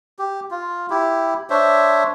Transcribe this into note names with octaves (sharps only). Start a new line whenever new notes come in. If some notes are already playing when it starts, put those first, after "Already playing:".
G4
F4
E4 G4
D4 C5 C#5 E5